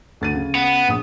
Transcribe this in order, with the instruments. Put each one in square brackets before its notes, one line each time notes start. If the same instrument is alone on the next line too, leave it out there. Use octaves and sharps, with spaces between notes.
[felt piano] D2 A6 D#7
C#3
[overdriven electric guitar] B3
[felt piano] A#1 D#6